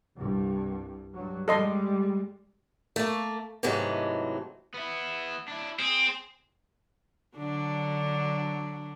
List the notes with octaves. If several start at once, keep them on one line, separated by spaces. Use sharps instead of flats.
C2 G2
G2 F#3
G3 G#3 A4 D#5 C6
A3 A#3
G#2 C3 E3 F#3 G#3 A3
B3 E4
D4 E4
C4 G#4
D3 F#3 D4